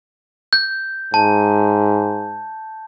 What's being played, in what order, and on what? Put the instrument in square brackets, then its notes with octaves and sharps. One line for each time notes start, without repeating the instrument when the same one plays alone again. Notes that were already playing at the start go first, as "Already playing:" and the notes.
[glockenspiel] G6
[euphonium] G#2 [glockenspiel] A5